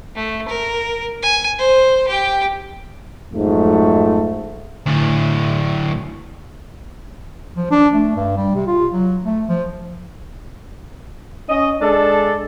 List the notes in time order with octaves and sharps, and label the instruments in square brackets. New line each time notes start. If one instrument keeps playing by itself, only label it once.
[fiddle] A3
A#4
G#5
C5
G4 G5
[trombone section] F2 G#2 F#3 A3
[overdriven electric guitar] D2 A2
[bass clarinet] F3
D4
A3
G2
G3
C3
F4
F#3
A3
F3
[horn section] C#4 D#5
G#3 D4 A4